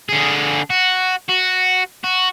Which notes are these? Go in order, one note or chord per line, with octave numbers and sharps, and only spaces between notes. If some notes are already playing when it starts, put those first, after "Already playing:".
D3 G#4
F#4
F#4
F#4